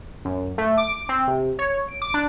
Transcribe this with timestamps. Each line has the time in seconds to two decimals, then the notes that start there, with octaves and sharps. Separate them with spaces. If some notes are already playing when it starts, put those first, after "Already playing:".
0.25 F#2
0.58 A3
0.77 D6
1.09 C4
1.28 C3
1.59 C#5
1.89 D7
2.02 D6
2.14 D4